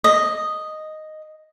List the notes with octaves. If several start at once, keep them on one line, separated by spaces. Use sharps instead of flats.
D#5